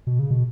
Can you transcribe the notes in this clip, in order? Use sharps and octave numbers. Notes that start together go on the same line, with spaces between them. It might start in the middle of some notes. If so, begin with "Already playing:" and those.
B2
C#3
B2